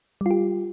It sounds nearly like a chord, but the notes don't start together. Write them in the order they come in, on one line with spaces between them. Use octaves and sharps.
G3 F4 G4